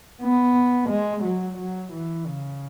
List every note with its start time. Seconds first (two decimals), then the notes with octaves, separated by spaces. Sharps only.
0.22 B3
0.90 G#3
1.24 F#3
1.58 F#3
1.93 E3
2.26 C#3